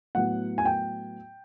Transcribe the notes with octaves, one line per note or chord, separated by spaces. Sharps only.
A2 F#3 B3 F#5
G#5
G5